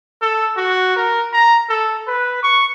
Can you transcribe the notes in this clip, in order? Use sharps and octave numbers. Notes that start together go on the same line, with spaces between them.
A4
F#4
A#4
A#5
A4
B4
C#6